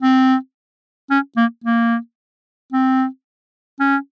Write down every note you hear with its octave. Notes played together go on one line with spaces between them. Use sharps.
C4
C#4
A#3
A#3
C4
C#4